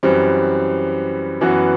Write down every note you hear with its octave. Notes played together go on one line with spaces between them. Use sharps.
F#2 E3 G3 C4
F#2 E3 B3 F#4